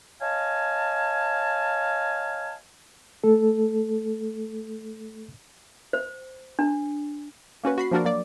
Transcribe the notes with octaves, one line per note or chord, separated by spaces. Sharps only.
C#5 D#5 F5 G#5 A5
A3 A4
C5
D4
A#3 C#4 F#4 B4
F#4 B5 C7
F3 A#3 D4 F#4 A#4 D5
F#3 A#3 D5 D6